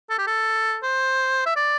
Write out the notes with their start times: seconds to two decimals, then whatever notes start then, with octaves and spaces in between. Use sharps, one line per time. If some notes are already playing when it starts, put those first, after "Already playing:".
0.10 A4
0.19 G4
0.27 A4
0.83 C5
1.46 E5
1.56 D5